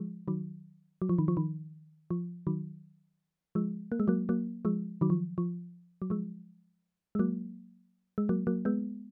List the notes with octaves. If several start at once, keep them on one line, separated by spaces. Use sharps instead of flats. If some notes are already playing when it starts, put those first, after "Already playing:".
Already playing: F3 G#3
D#3 F#3
F#3
F3
D#3
F3
D#3
F3
D#3 F#3
F3 G#3
A#3
G#3
F#3 A#3
F#3 A#3
F3 G#3
D#3 F#3
F3
F3
F#3
F3 G#3
G#3
F#3 A#3
G#3
F#3 A#3
F#3 A#3
G#3 B3